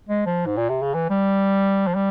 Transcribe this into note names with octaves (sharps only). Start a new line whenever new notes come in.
G#3
F3
G#2
A#2
C3
C#3
E3
G3
F3
G3